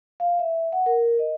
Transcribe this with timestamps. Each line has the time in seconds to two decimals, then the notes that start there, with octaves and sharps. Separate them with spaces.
0.20 F5
0.39 E5
0.72 F#5
0.86 A#4
1.19 D#5